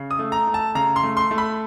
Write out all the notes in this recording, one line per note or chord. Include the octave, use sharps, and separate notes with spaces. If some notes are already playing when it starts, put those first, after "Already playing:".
Already playing: C#3
D#6
A3
A#5
A3
A5
C#3 A#5
C6
A3
C6
A3
B5